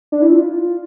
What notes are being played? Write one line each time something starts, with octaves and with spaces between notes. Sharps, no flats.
D4
E4
F4